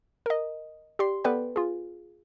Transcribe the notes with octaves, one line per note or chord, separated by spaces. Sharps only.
A#4 D#5
G4 D5 C6
B3 A4 B4 D5 G5
F4 G#4